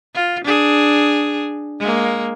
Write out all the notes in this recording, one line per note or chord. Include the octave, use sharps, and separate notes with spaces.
F4
D4 G#4
G#3 A#3